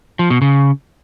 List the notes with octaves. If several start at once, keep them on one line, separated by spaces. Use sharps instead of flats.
F3
B2
C#3